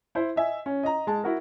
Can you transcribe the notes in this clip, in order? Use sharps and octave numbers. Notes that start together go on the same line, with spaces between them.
E4 C5
D#5 E5 G#5
C#4
D#5 A#5
G#3 A5
E4 F#4 A#4